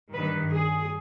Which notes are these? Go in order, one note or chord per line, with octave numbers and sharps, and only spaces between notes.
G2 D#3 B4
G#4